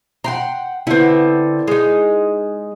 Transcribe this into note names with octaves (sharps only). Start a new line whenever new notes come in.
F#5 G5 A#5 C6
D3 B3 C4 E4
G#3 D#4